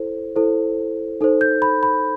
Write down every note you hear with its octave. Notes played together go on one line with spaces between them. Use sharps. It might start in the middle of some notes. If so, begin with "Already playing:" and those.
Already playing: E4 A4 C5
E4 A4 C5
D#4 A4 C5
G6
B5
B5